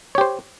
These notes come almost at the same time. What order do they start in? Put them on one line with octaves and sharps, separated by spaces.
C#5 G4 C5